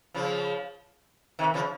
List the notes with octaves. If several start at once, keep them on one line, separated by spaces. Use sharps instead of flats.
C#3 F3
C3 D#3
C#3 F3